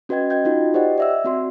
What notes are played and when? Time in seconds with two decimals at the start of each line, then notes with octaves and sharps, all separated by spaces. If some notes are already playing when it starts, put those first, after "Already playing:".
0.09 C#4 F#4 B4 D#5 G5 G#6
0.30 D#5 G5 G6 G#6
0.45 D#4 F4 F#4
0.74 G4 C5 D5 D#5 F#5 G5
0.98 D5 E5 E6
1.24 C4 F#4 C6